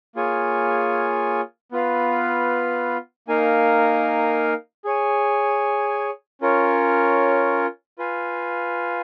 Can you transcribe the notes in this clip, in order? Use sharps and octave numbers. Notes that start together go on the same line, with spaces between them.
A#3 F4 G#4 C#5 G#5
B3 F4 B4 F5
A#3 D#4 A#4 F5 G#5
G#4 C#5 G#5
C#4 F4 A#4 C#5
F4 B4 F5 G#5